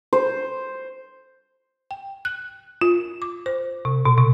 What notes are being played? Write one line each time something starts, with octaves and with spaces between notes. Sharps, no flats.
C5
G5
F#6
F4
D6
C5
C3
B2
C3